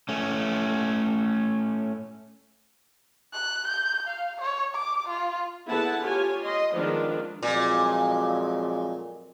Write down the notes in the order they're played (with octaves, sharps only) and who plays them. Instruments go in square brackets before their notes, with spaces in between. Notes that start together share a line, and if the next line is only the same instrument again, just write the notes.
[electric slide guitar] A3 C#4
[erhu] F#6
G6
F5
C#5
D6
F4
[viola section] D3 B3 E4 G#4 F#5 A5
F4 G4 C#5 G#5
D#5 C6
D#3 F3 G#3 B3 D4 F4
[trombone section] F2 F#3 G#3 [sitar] A#2